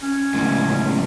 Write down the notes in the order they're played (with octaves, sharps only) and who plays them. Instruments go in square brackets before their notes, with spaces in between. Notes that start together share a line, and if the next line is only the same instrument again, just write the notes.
[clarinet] C#4
[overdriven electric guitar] C#2 A2